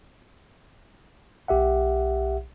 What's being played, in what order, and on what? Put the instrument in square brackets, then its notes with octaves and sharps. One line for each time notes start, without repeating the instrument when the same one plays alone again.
[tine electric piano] B1 G4 E5 F#5